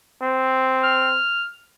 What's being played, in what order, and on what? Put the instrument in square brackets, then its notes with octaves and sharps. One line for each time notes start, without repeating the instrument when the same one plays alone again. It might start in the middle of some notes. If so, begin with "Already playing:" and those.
[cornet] C4
[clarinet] F6